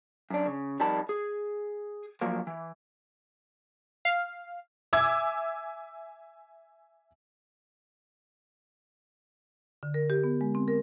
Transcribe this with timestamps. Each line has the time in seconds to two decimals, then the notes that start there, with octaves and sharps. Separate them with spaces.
0.30 F#2 D4
0.46 C#3
0.80 F2 G3 D#4 A#4 A5 B5
1.09 G#4
2.21 F3 F#3 A#3
2.47 E3
4.05 F5
4.93 E5 G#5 D6 E6 G#6
9.83 D3
9.94 A#4
10.10 G4
10.24 B3
10.41 G#3
10.55 C4
10.68 A#4